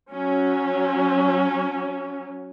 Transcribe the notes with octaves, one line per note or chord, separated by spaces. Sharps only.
F#3 C#4